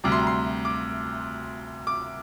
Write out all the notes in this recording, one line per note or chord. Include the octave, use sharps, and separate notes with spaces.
D2 C3 G3 D6
C6
A#5
C6
D6
D6